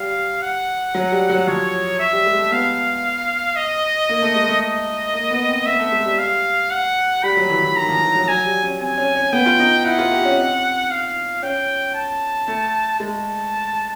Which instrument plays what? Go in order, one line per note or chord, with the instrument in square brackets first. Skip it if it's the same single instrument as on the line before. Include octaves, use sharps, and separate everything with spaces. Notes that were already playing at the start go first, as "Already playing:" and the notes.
Already playing: [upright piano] G3 [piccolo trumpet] F5
[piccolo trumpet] F#5
[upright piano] F#3
G3
F#3
[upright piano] F3 [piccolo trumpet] C#5
[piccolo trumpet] E5
[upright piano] G3
G#3
A3
[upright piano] B3 [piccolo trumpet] F5
[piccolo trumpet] D#5
[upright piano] A#3
A3
G#3
A3
[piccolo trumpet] D#5
[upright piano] A#3
B3
C4
[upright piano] B3 [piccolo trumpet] E5
[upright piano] A3
G#3
G3
[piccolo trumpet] F5
F#5
[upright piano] G3 [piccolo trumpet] B5
[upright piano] F#3
E3
E3
[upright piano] D#3 [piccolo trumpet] A#5
[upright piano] F3
E3
F#3
[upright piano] F#3 [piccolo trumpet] G#5
[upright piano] G3
C#4
[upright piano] C4 [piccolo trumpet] G#5
[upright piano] C#4
C#4
[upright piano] B3 [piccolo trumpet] G5
[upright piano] F4
D#4
[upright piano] E4 [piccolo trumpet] F#5
[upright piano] F4
G4
C#4
C4
[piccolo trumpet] F5
[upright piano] C#4 [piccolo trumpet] G5
[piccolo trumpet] A5
[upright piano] A3
[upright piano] G#3 [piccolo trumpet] A5